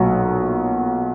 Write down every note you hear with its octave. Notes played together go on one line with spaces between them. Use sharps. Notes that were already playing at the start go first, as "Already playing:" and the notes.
Already playing: B1 A#2 F#3 F#4